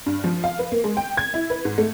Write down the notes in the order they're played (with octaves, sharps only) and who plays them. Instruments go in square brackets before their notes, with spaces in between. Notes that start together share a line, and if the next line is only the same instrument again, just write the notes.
[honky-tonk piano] G2
F3
F5
B4
A#3
G#3
G5
G#6
E4
B4
G#2
A3